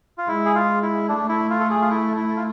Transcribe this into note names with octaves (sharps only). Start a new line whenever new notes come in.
F4
G#3 E4
G#4
F4
E4
A3 D4
E4
F4
A4
G#4
F4
E4
E4
F4